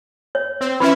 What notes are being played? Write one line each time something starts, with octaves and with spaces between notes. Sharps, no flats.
C#5
C4
E3 C#4 E4 B5